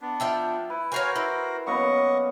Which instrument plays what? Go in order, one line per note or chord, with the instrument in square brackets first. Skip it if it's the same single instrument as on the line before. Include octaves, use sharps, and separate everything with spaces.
[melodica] B3 D4
[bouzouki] F3 E5 G5
[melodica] E4 [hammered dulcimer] B4
[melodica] F#4 A#4 C5 [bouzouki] C#5 F5 G#5
[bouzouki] E4
[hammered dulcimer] F#2 A#3 B3 [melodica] D#5 F#5 C#6